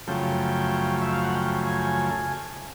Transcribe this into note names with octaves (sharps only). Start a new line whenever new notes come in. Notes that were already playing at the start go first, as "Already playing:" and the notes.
F#2 C#3 F3 A3 G5
E5
F5
F#5
G5
G#5